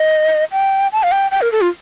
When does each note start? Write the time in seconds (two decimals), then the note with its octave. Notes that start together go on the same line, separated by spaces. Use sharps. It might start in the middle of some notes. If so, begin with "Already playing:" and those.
Already playing: D#5
0.52 G5
0.92 A5
1.03 F5
1.12 G5
1.31 G5
1.41 A#4
1.52 A4
1.61 F4